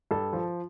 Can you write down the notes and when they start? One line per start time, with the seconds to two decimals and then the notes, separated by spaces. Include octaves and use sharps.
0.11 G2 A4
0.33 F3